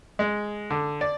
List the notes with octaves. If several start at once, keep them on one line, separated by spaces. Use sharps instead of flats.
G#3
D3
D5